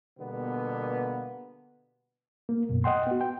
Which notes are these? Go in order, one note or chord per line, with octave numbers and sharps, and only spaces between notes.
B2 D3 G3 A#3 B3
A#3
F#2 B2
D#5 F#5 G5 C6
B3 F#4
G5